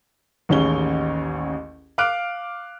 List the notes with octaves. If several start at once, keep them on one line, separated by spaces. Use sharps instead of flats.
A1 D#2 C#4 G#4 G7
F5 D6 F6 F#6 D7